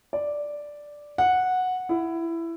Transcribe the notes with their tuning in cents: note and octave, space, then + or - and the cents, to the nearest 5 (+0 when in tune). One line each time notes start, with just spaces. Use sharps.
D5 +0
F#5 -10
E4 +15